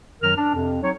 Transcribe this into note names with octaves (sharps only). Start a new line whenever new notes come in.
F#2 D#3 F#3 A#4 F6
D4
F2 C3
F#3 C4 D#4 C#5